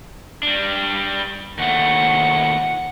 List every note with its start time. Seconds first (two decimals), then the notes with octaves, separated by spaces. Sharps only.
0.43 G3 D4
1.59 D#2 A3 F#5